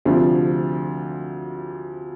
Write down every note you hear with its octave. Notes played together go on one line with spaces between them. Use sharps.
D2 C3 F3